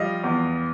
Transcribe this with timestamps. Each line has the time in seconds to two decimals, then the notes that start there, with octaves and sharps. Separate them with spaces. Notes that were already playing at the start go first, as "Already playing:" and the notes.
Already playing: F3 G3 D#5 F5
0.24 E2